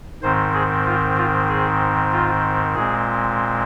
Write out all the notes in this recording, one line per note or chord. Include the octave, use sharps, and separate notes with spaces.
G#2 D#3 C4 C5
G#4
F4
F4
G#4
F4
A#2 G#3 C4 G#4